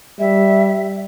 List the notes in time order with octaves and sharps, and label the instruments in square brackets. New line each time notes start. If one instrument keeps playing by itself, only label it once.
[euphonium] G3 [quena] E5